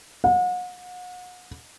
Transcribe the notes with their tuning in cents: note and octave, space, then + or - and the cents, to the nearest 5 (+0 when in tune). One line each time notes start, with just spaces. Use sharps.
F#5 -40